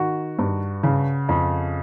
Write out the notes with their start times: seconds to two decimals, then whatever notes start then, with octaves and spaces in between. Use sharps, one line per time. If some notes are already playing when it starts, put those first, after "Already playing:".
Already playing: D#3 F#4
0.39 G2
0.83 C#3
1.29 F2